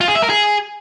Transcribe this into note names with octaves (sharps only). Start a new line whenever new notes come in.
F4
G#4
E5
A#4
G#4